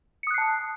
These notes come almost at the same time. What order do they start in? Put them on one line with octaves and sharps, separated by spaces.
C#7 D#6 F#6 C7 A5